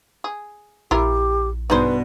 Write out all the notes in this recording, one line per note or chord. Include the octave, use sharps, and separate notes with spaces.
G#4
A#1 E4 F4 G4 A#4
G2 B2 D#4 G#4 B4 C5